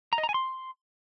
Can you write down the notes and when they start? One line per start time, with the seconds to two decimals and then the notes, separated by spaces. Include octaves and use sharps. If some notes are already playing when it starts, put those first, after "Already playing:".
0.13 A#5
0.18 D#5
0.23 A#5
0.29 G#5
0.34 C6